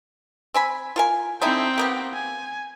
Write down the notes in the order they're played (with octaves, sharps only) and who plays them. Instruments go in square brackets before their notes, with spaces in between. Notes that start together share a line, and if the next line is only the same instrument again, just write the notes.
[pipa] C4 G#5 B5
F4 A#4 G#5
[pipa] D3 D#4 E4 [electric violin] C4 G5
[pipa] A#3 B3 G4
[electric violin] G#5